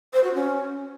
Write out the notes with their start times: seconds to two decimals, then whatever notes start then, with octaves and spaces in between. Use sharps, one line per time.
0.13 C5
0.24 F#4
0.34 C#4